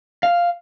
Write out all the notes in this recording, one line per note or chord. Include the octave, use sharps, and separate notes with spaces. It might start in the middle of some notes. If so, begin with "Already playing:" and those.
F5